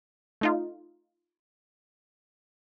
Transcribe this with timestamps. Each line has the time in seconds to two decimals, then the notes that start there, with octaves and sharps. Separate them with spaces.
0.41 A3 D#4 F4